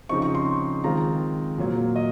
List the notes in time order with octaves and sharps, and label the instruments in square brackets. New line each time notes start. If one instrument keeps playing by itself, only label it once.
[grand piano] C#3 F3 C4 D#4 C#6
C#6
C6
D#3 G#3 C4 F4 A#5
A#2 F#3 A#3
D#5